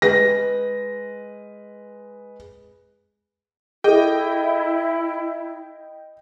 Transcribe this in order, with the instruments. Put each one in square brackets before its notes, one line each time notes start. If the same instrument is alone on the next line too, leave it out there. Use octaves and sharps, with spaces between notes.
[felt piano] G#3 B4 A#6
[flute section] E4 [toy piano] G#4 A4 [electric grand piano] D#5 G5